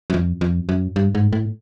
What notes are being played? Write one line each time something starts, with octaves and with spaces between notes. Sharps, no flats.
F#2
F2
F2
F#2
G2
G#2
A2